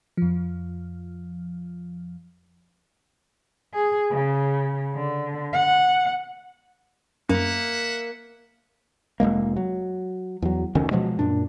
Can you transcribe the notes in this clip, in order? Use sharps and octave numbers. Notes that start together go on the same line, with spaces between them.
F2 F3
G#4
C#3
D3
F#5
F#2 A#3 E5 F#5
F1 E2 G#3 A#3
F#3
E2 F#3
F1 D2 D#3 C#4
B2 F3 F#3 G#3
F#2 A#2 D4